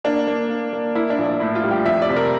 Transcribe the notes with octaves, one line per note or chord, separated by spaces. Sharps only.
A#3 D4
A#3
A#3
A#3
A#3 E4
D4
A#1
D4
A2 E4
F4
G3
G4
F2 E5
D5
C3
A#4